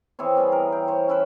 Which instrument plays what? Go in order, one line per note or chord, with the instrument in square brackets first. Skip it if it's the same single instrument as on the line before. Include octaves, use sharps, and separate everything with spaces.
[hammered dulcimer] E3 C4 G#4 C#5
G3 B3 E4 G#4
A#4
G5
C5 C#5
C#4 E4 B4